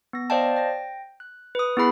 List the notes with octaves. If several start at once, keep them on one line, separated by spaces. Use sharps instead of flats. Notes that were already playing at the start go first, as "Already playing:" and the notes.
B3 A#6
C5 D5 D#5 F5 G5 A5
G5 A#6
F#6
B4 D#6
B3 E4 G#4 B5 C7